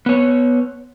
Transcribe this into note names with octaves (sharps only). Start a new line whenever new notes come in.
B3 C#5